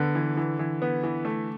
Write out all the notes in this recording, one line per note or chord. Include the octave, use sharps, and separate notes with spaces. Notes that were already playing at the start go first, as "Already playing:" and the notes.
Already playing: D3 B3
E3
E3
E3
B3
E3
A3